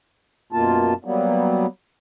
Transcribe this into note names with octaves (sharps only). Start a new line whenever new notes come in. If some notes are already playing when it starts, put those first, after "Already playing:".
F#2 B2 A#3 F4 A5
F#3 G3 A#3 B3